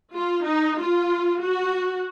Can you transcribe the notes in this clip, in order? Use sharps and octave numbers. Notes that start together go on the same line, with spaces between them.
F4
D#4
F4
F#4